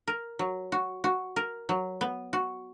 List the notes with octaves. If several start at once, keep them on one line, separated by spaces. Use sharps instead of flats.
A#4
F#3
F#4
F#4
A#4
F#3
B3
F#4